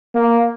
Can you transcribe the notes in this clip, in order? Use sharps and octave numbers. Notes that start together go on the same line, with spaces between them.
A#3